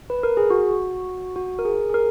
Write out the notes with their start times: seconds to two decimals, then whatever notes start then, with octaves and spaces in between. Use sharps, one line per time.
0.10 B4
0.23 A#4
0.37 G#4
0.50 F#4
1.36 F#4
1.59 A#4
1.65 G#4
1.90 G#4
1.94 A#4